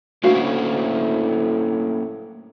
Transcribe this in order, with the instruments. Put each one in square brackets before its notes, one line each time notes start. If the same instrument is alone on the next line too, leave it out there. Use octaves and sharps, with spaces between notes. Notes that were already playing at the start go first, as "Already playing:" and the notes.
[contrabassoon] D2 [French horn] A2 [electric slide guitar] A#3 C#4 E4 [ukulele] F#4 F5